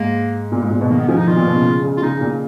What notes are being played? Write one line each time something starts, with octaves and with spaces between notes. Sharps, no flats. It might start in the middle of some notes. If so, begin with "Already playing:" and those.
Already playing: G#2 A#3
A#2
G#2
A#2
B2
D#3 A#3
B3
F3 C#4
D#4
D#3 F4
A#2
B2
C#3
C#3
C#3
F4
C#3 D#4
A#2